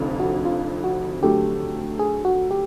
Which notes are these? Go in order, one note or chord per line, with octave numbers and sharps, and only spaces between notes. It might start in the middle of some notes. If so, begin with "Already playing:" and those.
Already playing: F1 F2 D3
F#4
F4
F#4
D3 F#3 A3 G4
G#4
F#4
G4